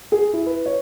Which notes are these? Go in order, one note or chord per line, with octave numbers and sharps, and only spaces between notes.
G#4
E4
B4
C#5